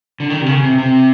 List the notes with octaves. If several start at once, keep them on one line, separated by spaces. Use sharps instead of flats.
D3
D#3
C3
C#3
C3
C3